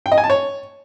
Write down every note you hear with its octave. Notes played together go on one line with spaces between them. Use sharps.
G5
D#5
G#5
A5
C#5